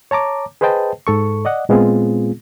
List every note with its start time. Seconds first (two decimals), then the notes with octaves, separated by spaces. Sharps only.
0.11 C#5 A5 A#5 D6
0.61 G#4 B4 C5 D#5 G5 A5
1.07 G#2 A4 C#6
1.45 D5 D#5 F#5
1.69 A#2 G#3 B3 C4 F4 G#4